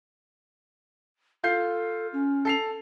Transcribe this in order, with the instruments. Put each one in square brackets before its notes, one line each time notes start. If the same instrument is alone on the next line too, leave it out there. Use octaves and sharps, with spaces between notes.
[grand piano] F4 G6 C7 [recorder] A4
[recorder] C#4
[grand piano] A4 C7 F7